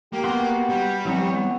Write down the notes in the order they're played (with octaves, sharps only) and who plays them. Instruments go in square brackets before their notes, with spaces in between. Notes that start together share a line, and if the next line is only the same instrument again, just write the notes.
[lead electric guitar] A#3 [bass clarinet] G4
[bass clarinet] B3 [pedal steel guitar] F#4 G4 C6
[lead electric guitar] G3
[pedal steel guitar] E3 C4 C#5 [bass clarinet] F#3
[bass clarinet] B3